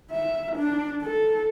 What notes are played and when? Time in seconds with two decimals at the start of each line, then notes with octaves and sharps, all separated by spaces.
0.12 E5
0.56 D4
1.02 A4